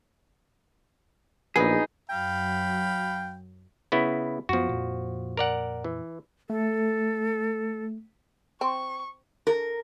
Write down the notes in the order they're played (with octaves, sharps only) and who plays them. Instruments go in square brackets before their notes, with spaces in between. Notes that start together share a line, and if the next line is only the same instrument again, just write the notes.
[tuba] A#1 [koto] F#3 B3 [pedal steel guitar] D#4 G#4
[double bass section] F#2 F#3 [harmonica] F5 B5 [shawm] G5
[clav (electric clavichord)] C#3 B3 E4
[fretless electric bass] F#2 B3 [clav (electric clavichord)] F3 F#4
[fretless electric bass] F2 A#2
[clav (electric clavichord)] A#4 D5 F#5
E3
[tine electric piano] A3 [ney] A4
[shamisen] C4 [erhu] C#6
[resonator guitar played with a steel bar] A#4